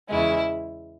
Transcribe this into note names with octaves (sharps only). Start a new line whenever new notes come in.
E2 C#3 G#3 E4